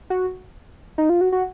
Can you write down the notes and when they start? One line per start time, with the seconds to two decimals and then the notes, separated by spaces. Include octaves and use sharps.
0.10 F#4
0.98 D#4
1.09 F4
1.21 F#4
1.32 F#4